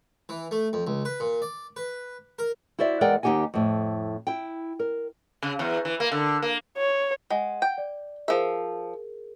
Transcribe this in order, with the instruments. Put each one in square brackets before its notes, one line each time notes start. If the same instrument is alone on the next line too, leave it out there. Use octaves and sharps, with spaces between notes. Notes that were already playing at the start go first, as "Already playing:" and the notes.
[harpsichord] E3
A3
F2
C#2
B4
A#2
D5
B4
A#4
[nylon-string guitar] E4 F#4 C5 D5 E5
E2 G#3 A#4 D5 F#5 G5
D#2 D#4 G4 F#5 G#5
F2 A2
E4 G5
A#4
[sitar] C#3
E2
E3
A#3
D3
A#3
[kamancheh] C#5
[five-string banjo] G#3 [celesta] F#5
[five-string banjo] G5
[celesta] D5
[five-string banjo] F3 E5 [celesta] G#4 A#4